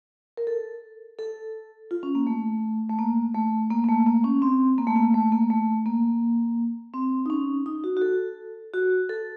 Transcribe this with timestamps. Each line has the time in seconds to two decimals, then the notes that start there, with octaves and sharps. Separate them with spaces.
0.37 A#4
0.47 A4
1.19 A4
1.91 F4
2.03 C#4
2.15 A#3
2.27 A3
2.89 A3
2.99 A#3
3.34 A3
3.71 A#3
3.84 A#3
3.89 A3
4.06 A#3
4.24 C#4
4.42 C4
4.78 A#3
4.87 A3
4.96 A#3
5.14 A3
5.32 A#3
5.50 A3
5.86 A#3
6.93 C4
7.26 D#4
7.30 C#4
7.66 D#4
7.84 F#4
7.97 F#4
8.02 A4
8.74 F#4
9.09 A4